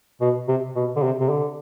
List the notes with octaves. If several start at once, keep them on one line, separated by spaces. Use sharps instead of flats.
B2
C3
B2
D3
C3
C3
D3